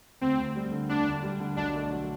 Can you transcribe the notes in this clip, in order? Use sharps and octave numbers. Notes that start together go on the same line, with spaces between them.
D2 C4
D2
G3
D3
D2 D4
D2
G3
D3
B1 D4
A3
F#3